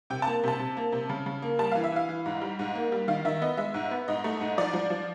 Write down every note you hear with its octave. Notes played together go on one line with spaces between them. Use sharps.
C3 G5
A#3 A5
C3 A5
C3
A#3
C3
C#3
C#3
A#3
G3 A5
E3 F5
E5
E3 F5
E3
G#2
G3
G#2
A#3
G3
D#3 F5
D#3 E5
B3 D#5
G#3 E5
G#2
B3
G#2 D#5
A3
G#2
F3 D5
F3
F3